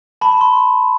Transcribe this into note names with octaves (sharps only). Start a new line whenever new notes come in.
A5 B5
C6